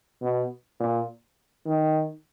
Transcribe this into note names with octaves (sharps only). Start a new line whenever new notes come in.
B2
A#2
D#3